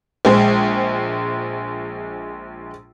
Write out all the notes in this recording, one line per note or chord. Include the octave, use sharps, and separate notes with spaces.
A#1 G#3 C5